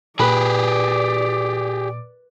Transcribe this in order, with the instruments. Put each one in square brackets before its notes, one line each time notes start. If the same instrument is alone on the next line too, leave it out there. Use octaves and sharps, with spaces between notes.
[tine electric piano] A#2 [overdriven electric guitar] G4 G#4 [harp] B4 [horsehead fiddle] D5